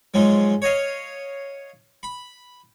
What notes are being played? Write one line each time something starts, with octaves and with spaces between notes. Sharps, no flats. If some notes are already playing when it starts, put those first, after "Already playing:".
G#2 F3 F#3 G#3
C#5 D#5 F5
B5